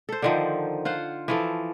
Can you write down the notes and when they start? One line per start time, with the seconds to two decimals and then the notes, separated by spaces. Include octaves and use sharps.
0.09 A4 C5
0.22 D3 D#3 F3
0.85 F4 C5 F#5
1.28 E3 F3 A4